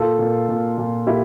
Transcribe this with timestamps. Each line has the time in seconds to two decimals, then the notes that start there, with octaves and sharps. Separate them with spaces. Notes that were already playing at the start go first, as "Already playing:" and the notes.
Already playing: A#2 F4 A4
0.19 A#2
0.49 A#2
0.78 A#2
1.07 A#2 E4 G4